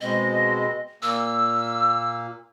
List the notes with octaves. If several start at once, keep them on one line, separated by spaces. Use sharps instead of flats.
B2 G#3 C4 D#5
A#2 A#3 E6